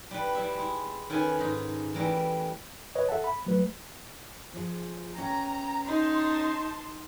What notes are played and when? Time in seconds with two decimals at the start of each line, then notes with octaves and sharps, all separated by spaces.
0.11 G3 B4
0.35 G3 E4 E5
0.55 G#3 E4
1.10 D#3 C#4 A4 B4 G#5
1.39 G#2 D#4
1.94 E3 G3 A3 A#4 E5
2.95 B4 C#5 D#5
3.09 A4 E5 F#5 A5
3.24 B5
3.46 F#3 A3 B4
4.54 F3 G#4
5.16 B3 C#4 G5 A#5
5.88 D#4 A5 C6